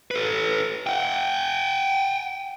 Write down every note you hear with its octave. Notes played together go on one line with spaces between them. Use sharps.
A4 B4
F#5 G5